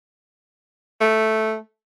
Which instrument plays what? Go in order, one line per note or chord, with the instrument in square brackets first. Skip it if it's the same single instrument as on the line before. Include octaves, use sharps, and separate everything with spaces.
[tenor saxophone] A3